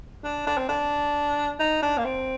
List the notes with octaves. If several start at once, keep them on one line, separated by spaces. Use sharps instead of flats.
D4
D4
C4
D4
D#4
D4
A#3
C4